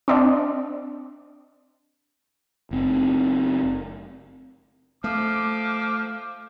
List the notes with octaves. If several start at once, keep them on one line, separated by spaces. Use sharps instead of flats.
C4 D4 D#5
F#1 C4
F3 A3 D6